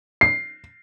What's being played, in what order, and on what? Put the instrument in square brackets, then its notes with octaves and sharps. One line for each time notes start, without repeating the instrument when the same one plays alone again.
[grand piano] C7